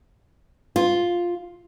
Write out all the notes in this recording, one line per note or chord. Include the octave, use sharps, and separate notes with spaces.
F4